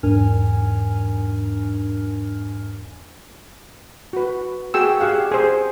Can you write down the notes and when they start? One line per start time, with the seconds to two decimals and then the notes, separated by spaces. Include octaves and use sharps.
0.03 E2 G#2 D4 A#4 G#5 F6
4.13 F#4 B4
4.74 F#4 G#4 G5 E6
5.00 G4 G#4 F5 F#5
5.31 G#4 C5